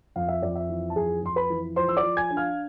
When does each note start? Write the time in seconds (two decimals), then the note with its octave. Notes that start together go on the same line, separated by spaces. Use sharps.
0.16 F2 F5
0.29 E5
0.43 F2 D5
0.55 E5
0.70 E3
0.90 A5
0.96 F2 G#4 G#5
1.23 F2 C6
1.36 B4 B5
1.50 E3
1.76 F3 C5 C6
1.88 E6
1.97 D5 D6
2.03 F3
2.17 G#5 G#6
2.31 D4
2.37 F5 F6